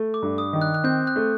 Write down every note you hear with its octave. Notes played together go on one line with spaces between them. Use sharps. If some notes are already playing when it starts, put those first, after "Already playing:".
Already playing: A3
D6
G2
D#6
D#3
F#6
F#6
C4 G6
F#6
A3